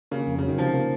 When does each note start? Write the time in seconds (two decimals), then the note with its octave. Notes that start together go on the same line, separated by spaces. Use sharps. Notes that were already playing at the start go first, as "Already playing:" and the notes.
0.11 C#3 A#3
0.27 F2
0.38 C#3 F#3
0.49 D#3
0.58 C3 F3
0.73 A#3